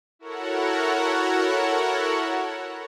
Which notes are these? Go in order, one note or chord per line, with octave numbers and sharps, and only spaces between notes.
E4 F#4 A4 A#4 C#5 F#5